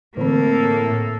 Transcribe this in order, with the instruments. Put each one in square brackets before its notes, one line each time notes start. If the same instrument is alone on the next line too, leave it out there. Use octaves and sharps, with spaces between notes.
[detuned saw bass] A2 [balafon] D3 E3 C4 [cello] A#3 [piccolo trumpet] A4